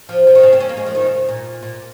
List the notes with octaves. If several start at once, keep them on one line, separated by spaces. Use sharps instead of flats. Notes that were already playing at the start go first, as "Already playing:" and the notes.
F3
F3
D#3
C#3
C4
C#4
A#3
G#3
F3
D#3
C#3
A#2
A#2